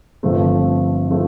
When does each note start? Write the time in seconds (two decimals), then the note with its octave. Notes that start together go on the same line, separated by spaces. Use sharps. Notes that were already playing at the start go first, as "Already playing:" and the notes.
0.23 G1 G2 F3 A3 C4
1.10 F3 A3 C4